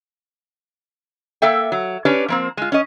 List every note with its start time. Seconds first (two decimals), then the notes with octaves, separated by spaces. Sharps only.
1.42 A#3 A4 E5 G5
1.72 F#3
2.05 C#4 D4 G4 B4 C#5
2.28 F3 A#3 C4
2.57 G#3 F4
2.72 C#4 D#5